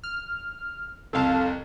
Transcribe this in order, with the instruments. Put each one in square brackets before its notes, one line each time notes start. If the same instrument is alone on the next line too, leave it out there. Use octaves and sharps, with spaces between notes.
[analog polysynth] F6
[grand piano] C2 F2 [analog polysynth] A4 F5 A5